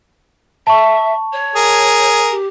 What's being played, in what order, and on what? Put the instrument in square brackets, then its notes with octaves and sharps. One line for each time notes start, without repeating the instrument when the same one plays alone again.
[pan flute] E5 [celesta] A5 C#6
[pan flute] C#5
[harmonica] G#4 A#4
[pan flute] G4